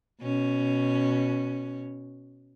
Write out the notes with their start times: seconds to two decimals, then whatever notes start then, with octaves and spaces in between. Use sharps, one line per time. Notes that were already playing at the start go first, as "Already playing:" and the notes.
0.22 B2 C#4